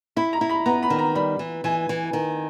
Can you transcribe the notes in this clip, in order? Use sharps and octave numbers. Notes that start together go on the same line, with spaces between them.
E4 B5
A#5
E4
B5
B3 A#5
B5
D#3
A#5
G3 B5
E3
E3 G#5
E3
D#3